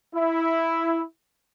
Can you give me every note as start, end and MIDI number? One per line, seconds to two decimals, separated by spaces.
0.14 1.02 64